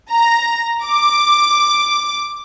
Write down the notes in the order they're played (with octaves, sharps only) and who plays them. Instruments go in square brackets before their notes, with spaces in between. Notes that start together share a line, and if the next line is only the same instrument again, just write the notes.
[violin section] A#5
D6